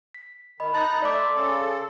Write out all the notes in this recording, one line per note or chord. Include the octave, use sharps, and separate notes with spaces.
B6
D#3 D#5 B5
D#4 A5 A#5 F#6 A6
A3 D5 E5 A5 D6
C6
C#3 A4